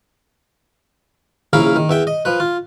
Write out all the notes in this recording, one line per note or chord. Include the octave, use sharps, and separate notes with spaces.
A#1 C#3 E4 A#4 F5 B5
D#3
E2 E5 G5
D#5
F3 B4
F4